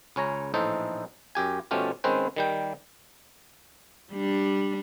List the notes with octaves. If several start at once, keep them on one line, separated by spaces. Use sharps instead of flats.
C#2 C#4 C#5 A#5
A#1 A2 E3 D#4 A4 C5
F#2 G4 G#5
B2 F3 A3 C#4 F4 G4
D#3 G#3 C4 C#4 B4 C5
D#3 G3 G5
G3 D4